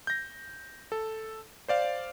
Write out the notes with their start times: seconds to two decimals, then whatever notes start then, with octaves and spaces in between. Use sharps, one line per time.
0.07 G6 A#6
0.92 A4
1.68 C5 D5 F5